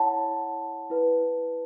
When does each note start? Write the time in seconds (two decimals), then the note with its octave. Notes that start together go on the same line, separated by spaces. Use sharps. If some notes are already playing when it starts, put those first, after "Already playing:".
Already playing: E4 C#5 F#5 A5 B5
0.90 E4 B4